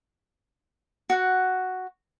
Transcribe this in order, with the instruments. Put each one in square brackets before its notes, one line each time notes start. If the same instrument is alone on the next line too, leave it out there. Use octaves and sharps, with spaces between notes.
[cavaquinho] F#4 F#5